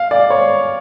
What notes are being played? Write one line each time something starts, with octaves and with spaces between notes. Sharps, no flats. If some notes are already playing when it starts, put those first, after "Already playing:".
Already playing: F5
D5
C#5